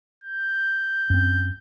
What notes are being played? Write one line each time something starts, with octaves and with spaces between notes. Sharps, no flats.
G6
F#2 C4